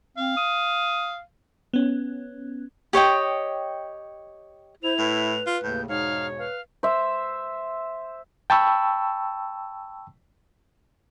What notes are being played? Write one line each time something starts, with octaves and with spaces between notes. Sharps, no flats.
C4 F5
D#6
B3 C#4
G4 C#5 D#5 G5
E4 C5 F7
A2 B4
F4
D#2 A2 C#3 G6
E2 G#2 B2 D#4 C#5 F5
B4 F5
C5 E5
G5 A5 B5 C#6 E6